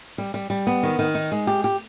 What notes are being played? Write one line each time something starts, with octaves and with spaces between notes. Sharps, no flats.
G3
G3
G3
B3
D#3
D#3
D#4
G#3
G4
G4